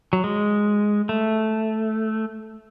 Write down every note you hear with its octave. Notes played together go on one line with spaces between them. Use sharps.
F#3
G#3
A3